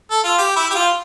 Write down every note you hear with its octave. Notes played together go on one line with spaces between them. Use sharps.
A4
F4
G4
E4
G4
F4